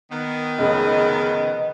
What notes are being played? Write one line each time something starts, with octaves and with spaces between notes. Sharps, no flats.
D#3 B3
F1 C#3 D#5